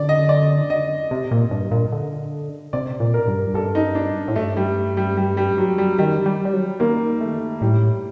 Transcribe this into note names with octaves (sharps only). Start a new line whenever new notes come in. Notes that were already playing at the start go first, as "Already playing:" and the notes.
Already playing: D3 D5
D#5
D5
D#5
C3
A#2
G2
A#2
D3
C3 D5
A#2
A#4
G2
G2 A4
D#4
D4
A2
G2 A3
G3
G3
G3
G3
F#3
G3
D#3 G3
G3
G3
F#3
D#3 A#3
A3
A2 G3